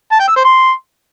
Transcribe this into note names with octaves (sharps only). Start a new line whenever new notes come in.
A5
G5
E6
C5
C6